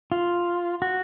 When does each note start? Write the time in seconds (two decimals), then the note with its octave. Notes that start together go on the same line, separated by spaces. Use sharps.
0.12 F4
0.82 F#4